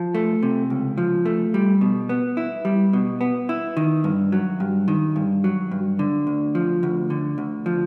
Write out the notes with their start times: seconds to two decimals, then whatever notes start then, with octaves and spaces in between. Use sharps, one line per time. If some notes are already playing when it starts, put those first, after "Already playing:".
Already playing: F3
0.15 A3
0.43 C3
0.70 C#2
0.98 F3
1.26 A3
1.54 G3
1.81 B2
2.09 B3
2.37 E4
2.65 G3
2.93 B2
3.21 B3
3.49 E4
3.77 D#3
4.04 G2
4.32 F#3
4.60 G2
4.88 D#3
5.16 G2
5.44 F#3
5.71 G2
5.99 D3
6.27 D2
6.55 F3
6.83 D2
7.10 D3
7.38 D2
7.66 F3